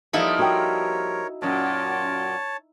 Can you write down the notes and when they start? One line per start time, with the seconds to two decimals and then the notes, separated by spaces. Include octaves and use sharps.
0.13 F3 G3 A#3 D#4 E4 A4
0.39 F#4 A#4 C#5 G5
1.42 F#2 A#2 C#5 A5